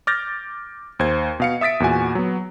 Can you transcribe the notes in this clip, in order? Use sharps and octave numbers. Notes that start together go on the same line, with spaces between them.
D6 F6 G6 A6 A#6
D#2 C5 G#6
B2 F5 C#7
E5 D#6 A6 B6 D7
E2 A#2 F#4 G#5
F#3 B3